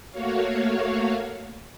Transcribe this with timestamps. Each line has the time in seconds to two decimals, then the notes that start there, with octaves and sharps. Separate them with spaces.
0.11 A3 A#3 F#4 C#5 F5